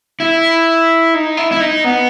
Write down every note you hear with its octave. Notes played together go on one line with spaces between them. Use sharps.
E4
D#4
E4
E4
D#4
B3